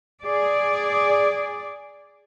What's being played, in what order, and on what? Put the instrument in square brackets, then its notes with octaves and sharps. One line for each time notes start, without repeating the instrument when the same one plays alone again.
[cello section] G#4 D5